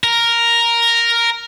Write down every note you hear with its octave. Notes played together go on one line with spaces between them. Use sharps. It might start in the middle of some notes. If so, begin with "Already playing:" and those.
A#4